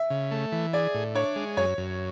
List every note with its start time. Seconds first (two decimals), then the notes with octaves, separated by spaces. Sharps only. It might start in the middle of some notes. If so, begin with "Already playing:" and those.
Already playing: E5
0.10 C#3
0.31 A3
0.52 E3
0.73 G#4 D5
0.94 A2
1.15 D4 C#5
1.36 G#3
1.57 F#2 C#5
1.78 F#2